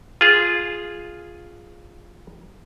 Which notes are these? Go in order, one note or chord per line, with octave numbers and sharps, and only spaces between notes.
F4 G#4